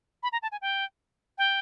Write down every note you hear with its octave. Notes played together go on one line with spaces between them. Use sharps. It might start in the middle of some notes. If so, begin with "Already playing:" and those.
B5
A#5
A5
G#5
G5
G5